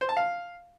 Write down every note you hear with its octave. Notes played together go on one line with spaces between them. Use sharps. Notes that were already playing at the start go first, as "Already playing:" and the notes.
C5
A5
F5